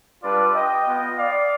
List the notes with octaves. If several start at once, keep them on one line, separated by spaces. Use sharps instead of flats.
G3 D4 F4 B4 D5
D#5 G5
B3 F4
D5 F5